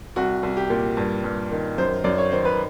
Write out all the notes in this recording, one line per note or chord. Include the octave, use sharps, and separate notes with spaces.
C2 F#4
C2
G4
A#2
G2
G2
D#3
F#2 C5
F#2 D5
C#5
D#3 C5
B4